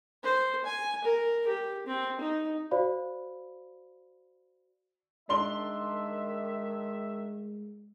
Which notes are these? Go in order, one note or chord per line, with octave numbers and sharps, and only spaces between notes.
C5
G#5
A#4
G4
C4
D#4
F#4 C5 D5 F5 B5
D#3 G#3 D4 E5 C6 G7